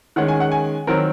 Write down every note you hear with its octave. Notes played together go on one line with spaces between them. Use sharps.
D#3 G#3 C#4 F#5
G#5
F#5
G#5
D#3 F#3 C4 A#4